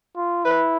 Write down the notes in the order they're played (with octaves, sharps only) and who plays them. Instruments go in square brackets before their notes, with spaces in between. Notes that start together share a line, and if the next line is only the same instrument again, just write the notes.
[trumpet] F4
[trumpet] E4 [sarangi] B4